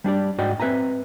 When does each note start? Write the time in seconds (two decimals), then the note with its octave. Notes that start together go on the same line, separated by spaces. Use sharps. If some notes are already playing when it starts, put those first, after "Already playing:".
0.04 G3 D4 G4 D5
0.38 G#2 F#4 D5 D#5 G5
0.60 C4 B4 E5 G#5 A#5